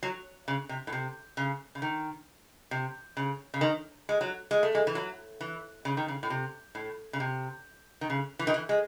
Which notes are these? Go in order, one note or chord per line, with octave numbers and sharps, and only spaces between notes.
F#3
C#3
C3
A2
C3
C#3
C#3
D#3
C3
C#3
C#3
D#3
G#3
F#3
G#3
A3
G#3
E3
F#3
E3
C#3
D#3
C#3
A2
C3
A2
C#3
C3
D#3
C#3
E3
D#3
E3
G#3